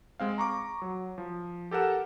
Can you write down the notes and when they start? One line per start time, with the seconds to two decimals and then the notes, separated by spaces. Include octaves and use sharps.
0.20 G#3 C4 F5
0.38 A#5 C#6 D6
0.82 F#3
1.18 F3
1.71 G4 A4 A#4 F#5 E7